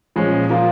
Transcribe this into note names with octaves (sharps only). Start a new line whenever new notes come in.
A#2 F3 G#3 C#4
F3 A#3 F4